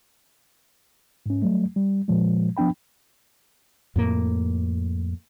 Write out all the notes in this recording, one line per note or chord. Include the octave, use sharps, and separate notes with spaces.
G#2 C#4
F#3 G3 A3
G3
A#2 F3 G#3
F3 B3 D4 G5 B5
F2 A2 A#3